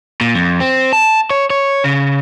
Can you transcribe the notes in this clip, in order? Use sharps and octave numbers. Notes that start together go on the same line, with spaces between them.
A#2
F2
C4
A5
C#5
C#5
C#3